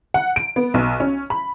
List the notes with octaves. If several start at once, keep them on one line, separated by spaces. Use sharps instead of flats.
F#5
D7
B3
B1
C#4
B5